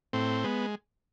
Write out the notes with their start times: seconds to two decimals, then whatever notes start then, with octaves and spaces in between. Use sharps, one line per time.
0.13 A2 C4
0.44 G#3 B3